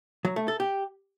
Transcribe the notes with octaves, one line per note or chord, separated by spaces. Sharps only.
F#3
A3
A4
G4